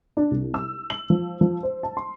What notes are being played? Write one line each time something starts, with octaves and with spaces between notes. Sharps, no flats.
D4
C2
E6
F#7
F3
F3
C5
A5
C6